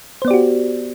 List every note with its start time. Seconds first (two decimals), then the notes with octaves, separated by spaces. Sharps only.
0.22 C5
0.25 B3
0.28 D5
0.31 G4
0.34 F#4